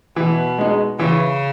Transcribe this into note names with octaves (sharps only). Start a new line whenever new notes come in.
B2 E3
G#3 D#4
C#3 E3